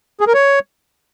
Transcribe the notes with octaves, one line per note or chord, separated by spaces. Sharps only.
G#4
A#4
C#5